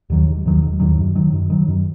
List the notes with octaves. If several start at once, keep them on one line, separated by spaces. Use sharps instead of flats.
D#2 D#3 F#3
E1
D#2 D#3 F#3
E1
D#2 D#3 F#3
F#2
D#3 F#3
F#2
D#3 F#3
F#2